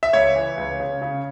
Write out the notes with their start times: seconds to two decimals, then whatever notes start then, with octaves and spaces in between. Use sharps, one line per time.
0.03 E5
0.13 C#2 C#5
0.36 E3
0.57 C#2
0.80 C#3
1.02 C#3